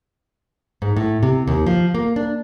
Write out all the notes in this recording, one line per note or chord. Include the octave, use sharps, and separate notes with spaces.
G#2
A2
C3
D#2
F3
A#3
D4